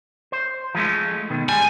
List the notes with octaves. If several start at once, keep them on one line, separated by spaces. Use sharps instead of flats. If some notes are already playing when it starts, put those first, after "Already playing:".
C5
F3 G#3 A3
B2 D#3
G3 G#3 G#5